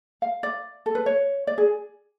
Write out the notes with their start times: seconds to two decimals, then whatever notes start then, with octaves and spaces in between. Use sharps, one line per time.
0.22 F5
0.43 D5
0.86 A4
0.95 B4
1.06 C#5
1.47 D5
1.58 G#4